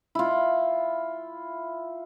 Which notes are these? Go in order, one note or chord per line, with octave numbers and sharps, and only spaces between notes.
E4 F4